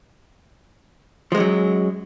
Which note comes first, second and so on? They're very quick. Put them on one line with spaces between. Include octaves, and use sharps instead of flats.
F3 G#3 F#2 F#3